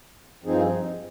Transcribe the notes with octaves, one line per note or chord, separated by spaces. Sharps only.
G2 F3 C4 D#4 G#4